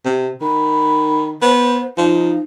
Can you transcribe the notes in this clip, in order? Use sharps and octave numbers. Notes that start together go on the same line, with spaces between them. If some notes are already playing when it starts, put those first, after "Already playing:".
C3
D#3 B5
B3 C5
F3 D#4